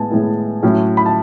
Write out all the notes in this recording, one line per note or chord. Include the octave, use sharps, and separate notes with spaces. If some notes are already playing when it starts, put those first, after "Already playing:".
Already playing: A2 G#3 B3 E4 G#5 A5
A2 G#3 B3 E4
A2 F#3 C#4 E4
B5
A5